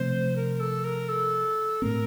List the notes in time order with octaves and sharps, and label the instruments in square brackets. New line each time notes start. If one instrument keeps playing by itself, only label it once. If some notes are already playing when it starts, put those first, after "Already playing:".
Already playing: [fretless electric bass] C3 F3 A3 C4 [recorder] C5
[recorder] A#4
A4
A#4
A4
[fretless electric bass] A2 A3 C4 [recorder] A#4